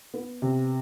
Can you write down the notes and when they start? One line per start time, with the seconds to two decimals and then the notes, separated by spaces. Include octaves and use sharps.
0.14 B3
0.42 C3